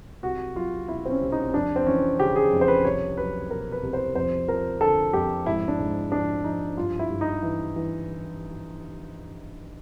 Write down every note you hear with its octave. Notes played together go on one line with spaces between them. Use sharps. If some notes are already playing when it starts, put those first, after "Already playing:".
C2 F#4
F#3 F4
B2 E4
C4
C#4
C2
D#4
C#4
F2 D4
C4
E3 C#4
C#3 G4
G#4
F2
C5
B4
C2 C#5
F#3 B4
B2 A#4
B4
C2
C5
F2 C5
F3 A#4
D3 A4
F2 G4
G#2 E4
D4
G#2
F3 D4
F3 D#4
G2 F4
E4
G2
D#4
E3
E3